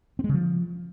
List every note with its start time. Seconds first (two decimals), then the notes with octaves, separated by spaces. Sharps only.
0.19 C4
0.24 G#3
0.29 C#3
0.34 F3